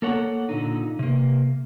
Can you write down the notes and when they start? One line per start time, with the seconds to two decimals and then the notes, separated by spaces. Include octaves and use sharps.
0.02 A#3 A4 C#5 F#5
0.49 A#2 D3 D#4
0.99 C3 A#3